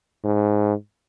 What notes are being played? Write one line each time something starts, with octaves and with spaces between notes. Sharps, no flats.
G#2